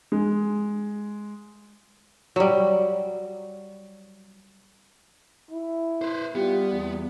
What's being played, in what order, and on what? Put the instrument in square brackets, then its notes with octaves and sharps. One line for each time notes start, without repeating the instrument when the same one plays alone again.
[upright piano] G#3
[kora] F#3 G3
[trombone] E4
[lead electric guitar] B4 C5
[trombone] G3 [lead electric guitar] B3 [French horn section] F4 G4
[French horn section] E2